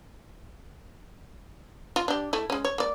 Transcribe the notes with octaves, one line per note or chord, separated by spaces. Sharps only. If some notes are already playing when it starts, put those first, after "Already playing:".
F4
D4 G4
A3 E4
G#3 C#4
C#5
A#3 D5